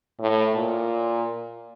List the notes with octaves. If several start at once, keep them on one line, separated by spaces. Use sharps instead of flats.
A2
A#2